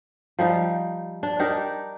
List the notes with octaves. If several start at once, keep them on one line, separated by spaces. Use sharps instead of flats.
F3 G3 D#4
D4
D4 D#4 G4 A#4